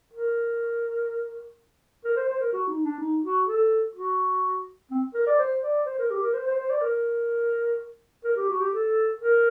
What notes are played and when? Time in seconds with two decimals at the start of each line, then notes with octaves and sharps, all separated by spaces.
0.13 A#4
2.05 A#4
2.16 C5
2.29 C5
2.40 A#4
2.53 F#4
2.68 D#4
2.84 D4
2.99 D#4
3.24 F#4
3.47 A4
3.95 F#4
4.91 C4
5.14 A#4
5.27 D5
5.39 C5
5.63 D5
5.86 C5
5.99 A#4
6.10 G4
6.22 A#4
6.34 C5
6.46 C5
6.58 C5
6.70 D5
6.81 A#4
8.24 A#4
8.36 G4
8.49 F#4
8.60 G4
8.73 A4
9.20 A#4